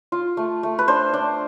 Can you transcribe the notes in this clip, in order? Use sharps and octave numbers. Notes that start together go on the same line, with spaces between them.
F4
A3
A3
B4
D4 C5
D4